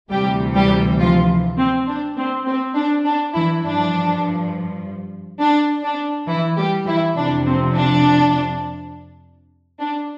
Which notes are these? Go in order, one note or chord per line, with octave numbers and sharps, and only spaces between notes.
D2 C3 E3 G3 G4
G3 G4
F3 F4
C4
D4
C4
C4
D4
D4
E3 E4
G2 F3 D4
D4
D4
E3 E4
G3 G4
E3 E4
F2 C3 F3 D4
C4
D4
D4